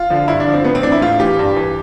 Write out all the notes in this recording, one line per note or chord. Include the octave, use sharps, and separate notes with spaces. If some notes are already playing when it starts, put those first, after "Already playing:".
Already playing: F4
D3 F3
G2 E4
D4
D3 F3
C4
A2 B3
C4
E3 D4
E4
A2 F4
E3 G4
G2
E3